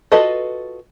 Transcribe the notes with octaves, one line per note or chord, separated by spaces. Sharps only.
F4 F#4 A4 B4 D#5